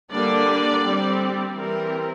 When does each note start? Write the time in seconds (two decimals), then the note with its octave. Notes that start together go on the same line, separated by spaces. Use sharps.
0.11 D3 G3 A#3 D4 D5
0.83 G3 C4
1.54 E3 G3 C4 A#4